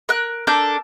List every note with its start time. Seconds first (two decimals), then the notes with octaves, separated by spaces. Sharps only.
0.09 A#4 F#6
0.47 D4 A4 A#4 G6